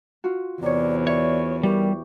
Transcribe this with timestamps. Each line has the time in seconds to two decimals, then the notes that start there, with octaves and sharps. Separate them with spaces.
0.24 F4 F#4
0.63 E2 C3 C#5 D5
1.07 C#5 D5 E5 C#6
1.63 G3 E4 G4 A#4 C#6